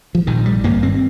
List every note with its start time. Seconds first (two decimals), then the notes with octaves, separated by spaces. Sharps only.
0.15 F3
0.27 A#1 G#2 D#3
0.46 G3
0.64 G#1 G2 A#3
0.83 C4